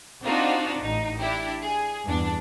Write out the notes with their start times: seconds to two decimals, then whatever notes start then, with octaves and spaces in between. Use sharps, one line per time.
0.23 C4 D4 D#4 F4 F#4
0.81 A1 D#4
1.19 D4 E4 G4
1.62 G#4
2.05 E2 G2 D4